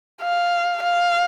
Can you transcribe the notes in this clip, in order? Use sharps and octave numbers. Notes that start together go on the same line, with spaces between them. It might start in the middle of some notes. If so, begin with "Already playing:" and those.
F5
F5